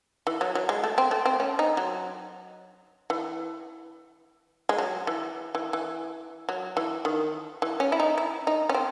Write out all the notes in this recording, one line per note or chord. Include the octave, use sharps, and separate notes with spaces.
E3
F#3
F#3
G#3
A3
C4
A3
C4
C#4
D#4
F#3
E3
G#3
F#3
E3
E3
E3
F#3
E3
D#3
E3
C#4
E4
D#4
E4
D#4
C#4
C4